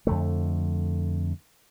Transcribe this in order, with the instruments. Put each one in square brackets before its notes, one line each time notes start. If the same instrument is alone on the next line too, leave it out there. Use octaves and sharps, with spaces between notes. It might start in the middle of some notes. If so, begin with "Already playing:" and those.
[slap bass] F2 D3 A3